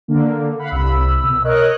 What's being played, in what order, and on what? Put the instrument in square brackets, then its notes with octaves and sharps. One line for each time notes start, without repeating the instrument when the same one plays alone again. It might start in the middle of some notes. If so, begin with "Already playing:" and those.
[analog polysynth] D3 A#3
F5 F#5 B5
[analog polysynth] C2 B5 [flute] E6
[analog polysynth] B2
[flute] A#4 [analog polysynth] C#5 D#5 F#6